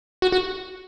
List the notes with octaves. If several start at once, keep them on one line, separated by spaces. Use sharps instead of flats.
F#4
F#4